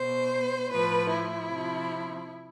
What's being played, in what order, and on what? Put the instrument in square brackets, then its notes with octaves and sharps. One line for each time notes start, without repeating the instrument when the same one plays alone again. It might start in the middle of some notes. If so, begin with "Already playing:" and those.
Already playing: [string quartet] B2 C5
A2 F3 B4
E4
C3 F3